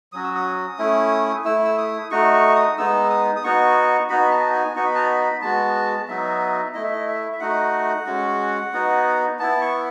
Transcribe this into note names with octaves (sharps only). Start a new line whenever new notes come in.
F#3 C#4 F#4 D#6
E6
D#6
D#6
A3 C#4 E4
A3 E4 E6
E6
D#6
A3 D#4 F#4 C#6
C#6
D#6
G#3 B3 D#4 E6
D#6
D#6
B3 D#4 F#4 C#6
B3 D#4 F#4 B5
A5
G#5
B3 D#4 F#4 C#6
B5
A5
B5
G#3 B3 F#4 A5
F#3 B3 D#4 F#4 E5
A3 E4 D#5
E5
D#5
E5
E5
A3 D#4 F#4 F#5
G#3 C#4 F#4
B3 D#4 F#4
B3 E4 A5
C#6